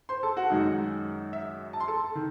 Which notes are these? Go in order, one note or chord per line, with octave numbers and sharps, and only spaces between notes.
C5 C6
A4 A5
F#4 F#5
F#2 D#3 G#3 D#4
E5
A5
C6
A4 A5
D#3